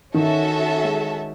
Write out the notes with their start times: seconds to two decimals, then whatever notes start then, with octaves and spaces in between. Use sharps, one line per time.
0.13 D#3 C#4 F#4 A4 E5 A5
0.84 G#3